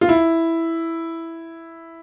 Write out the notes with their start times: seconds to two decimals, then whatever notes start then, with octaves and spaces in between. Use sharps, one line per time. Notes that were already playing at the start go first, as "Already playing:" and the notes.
0.01 F4
0.09 E4